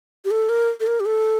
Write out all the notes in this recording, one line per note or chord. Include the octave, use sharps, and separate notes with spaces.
G4
A4
A#4
A4
A#4
G4
A4